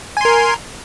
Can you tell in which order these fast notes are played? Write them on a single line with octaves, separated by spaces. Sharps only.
G#5 C6 A#4